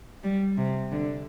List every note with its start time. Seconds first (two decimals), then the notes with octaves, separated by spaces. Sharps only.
0.24 G3
0.58 C3
0.92 D3